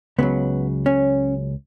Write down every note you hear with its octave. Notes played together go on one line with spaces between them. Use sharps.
C#2 C#3 F#3 B3
C#4